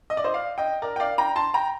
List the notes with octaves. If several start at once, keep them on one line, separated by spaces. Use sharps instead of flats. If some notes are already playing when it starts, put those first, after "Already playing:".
D#5
D5
C5 D#5
D5 F5
D#5 G5
A#4 D5
G5
D5 F5
G5 A#5
A5 C6
G5 A#5